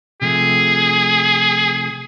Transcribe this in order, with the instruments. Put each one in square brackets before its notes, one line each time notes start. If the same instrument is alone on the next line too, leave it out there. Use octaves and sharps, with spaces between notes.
[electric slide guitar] C3 F3 A3 [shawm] G#4